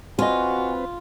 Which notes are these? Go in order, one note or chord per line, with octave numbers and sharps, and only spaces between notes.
C4 F4 F#4 B4 D#5 G#5